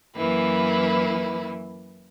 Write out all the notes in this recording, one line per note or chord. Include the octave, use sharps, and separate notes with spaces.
F#2 E3 A#3 E4 B4